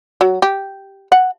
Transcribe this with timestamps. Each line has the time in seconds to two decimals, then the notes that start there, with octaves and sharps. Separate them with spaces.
0.21 F#3
0.42 G4
1.12 F#5